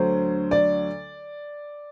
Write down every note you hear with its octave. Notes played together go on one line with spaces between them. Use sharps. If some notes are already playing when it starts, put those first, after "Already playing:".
Already playing: D2 D3 F#3 C5
D5